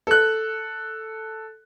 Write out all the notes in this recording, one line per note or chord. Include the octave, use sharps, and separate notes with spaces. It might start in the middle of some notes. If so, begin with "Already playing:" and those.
A4 F#6